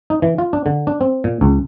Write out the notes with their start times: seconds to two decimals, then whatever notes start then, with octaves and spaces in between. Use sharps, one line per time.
0.10 D#4
0.22 E3
0.38 F4
0.53 D4
0.66 D3
0.87 D4
1.01 C4
1.24 A#2
1.41 C#2